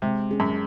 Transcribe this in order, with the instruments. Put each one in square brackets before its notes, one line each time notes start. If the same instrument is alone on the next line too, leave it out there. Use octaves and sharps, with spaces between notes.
[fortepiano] C3 [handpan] G#3
[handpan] C#4 G#4
[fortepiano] F#2